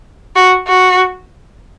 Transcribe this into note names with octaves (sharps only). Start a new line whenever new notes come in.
F#4
F#4